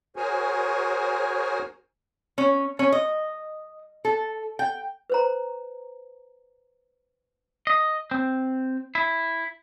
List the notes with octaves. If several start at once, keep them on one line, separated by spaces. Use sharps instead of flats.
F#4 G#4 A#4 C5 C#5 G#5
C#4
C#4
D#5
A4
G5
B4 C5 A#5
D#5
C4
E4